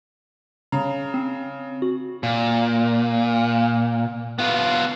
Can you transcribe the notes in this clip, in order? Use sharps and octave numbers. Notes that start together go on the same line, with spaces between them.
C#3 A#5
C4
F#4
A#2
B3 F4